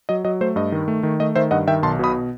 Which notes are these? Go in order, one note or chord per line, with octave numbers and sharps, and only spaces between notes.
F#3 D#5
F#3 D#5
A3 C5
G2 D#5
D#3
A3
D#3
A3 D#5
D#3 C5 E5
G2 D#5 F#5
D#3 E5 G5
B1 A5 C6
B2 B5 D#6